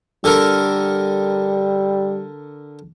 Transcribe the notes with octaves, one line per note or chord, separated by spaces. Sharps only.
D3 G3 A4 A#4